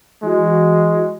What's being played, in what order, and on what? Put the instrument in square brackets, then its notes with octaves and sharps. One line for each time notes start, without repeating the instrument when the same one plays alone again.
[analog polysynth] E3 F#4 [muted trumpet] G#3